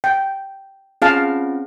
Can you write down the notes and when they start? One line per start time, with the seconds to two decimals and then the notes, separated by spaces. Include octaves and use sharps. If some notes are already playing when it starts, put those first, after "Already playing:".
0.04 G5
1.02 C4 C#4 F4 G#4 F5 A5